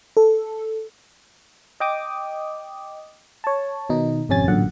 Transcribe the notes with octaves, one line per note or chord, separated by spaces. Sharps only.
A4
D#5 G5 D6 D#6
C#5 A5
B2 D#3 D#4
G#1 F2 C3 C#4 G#5 A6
A1 F#2 A#2 D3 F#5